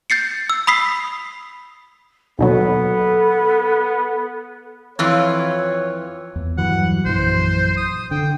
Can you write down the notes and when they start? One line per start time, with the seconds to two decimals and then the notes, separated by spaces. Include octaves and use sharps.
0.10 G6 A6 C7 C#7
0.49 E6
0.67 B5 D#6 B6 C7
2.39 D#2 B2 F#3 B3 A4
4.99 F2 E3 F4 C#5
6.36 E2
6.58 G2 E3 F#3 F#5
7.06 A#1 F#2 E3 C5
7.77 D#6
8.11 D3 G5